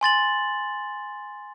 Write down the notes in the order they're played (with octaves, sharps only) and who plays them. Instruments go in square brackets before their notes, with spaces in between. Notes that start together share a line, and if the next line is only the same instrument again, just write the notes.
[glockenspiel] G#5 C6 A6 F#7